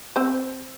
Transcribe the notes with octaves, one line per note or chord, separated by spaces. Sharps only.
C4 C5